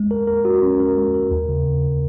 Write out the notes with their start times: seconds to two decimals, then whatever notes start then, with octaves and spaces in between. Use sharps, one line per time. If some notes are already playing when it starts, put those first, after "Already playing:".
Already playing: G#3
0.11 A#4
0.27 A#4
0.45 F#4
0.62 C#4
0.80 A#4
0.97 G#3
1.14 A#4
1.31 D#2
1.49 C#3
1.66 C#3
1.84 D#2